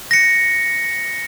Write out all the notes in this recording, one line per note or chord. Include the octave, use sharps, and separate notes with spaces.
A#6 C#7